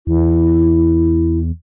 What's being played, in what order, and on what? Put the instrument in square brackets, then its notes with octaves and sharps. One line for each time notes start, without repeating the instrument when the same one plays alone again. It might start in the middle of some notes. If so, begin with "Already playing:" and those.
[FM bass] E2 [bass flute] E4